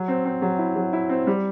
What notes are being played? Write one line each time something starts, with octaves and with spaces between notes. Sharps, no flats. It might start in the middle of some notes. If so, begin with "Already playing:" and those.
Already playing: F#3
C4
C4
F#3
E4
F#3
E4
C4
G3